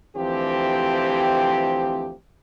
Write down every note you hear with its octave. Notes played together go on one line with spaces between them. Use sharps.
D2 E3 F3 C4 G4